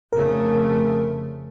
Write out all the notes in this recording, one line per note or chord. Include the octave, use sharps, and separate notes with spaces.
F1 C#3 A3 A#4